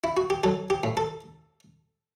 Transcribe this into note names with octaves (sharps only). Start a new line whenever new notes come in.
E4
F#4
G4
F#3 A4
G4
A2
A4